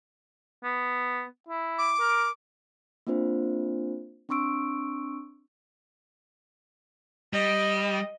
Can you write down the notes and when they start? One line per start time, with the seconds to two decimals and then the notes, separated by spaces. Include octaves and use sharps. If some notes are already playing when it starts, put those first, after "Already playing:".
0.64 B3
1.48 E4
1.78 D6
2.00 A#4
3.07 A#3 C4 D4 F4 C5
4.29 C4 D4 C6 C#6 E6 D7
7.33 G3 D#5